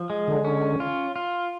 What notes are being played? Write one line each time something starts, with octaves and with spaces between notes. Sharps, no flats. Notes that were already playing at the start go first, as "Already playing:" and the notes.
Already playing: F3
G#3
D3
C#4
F4
F4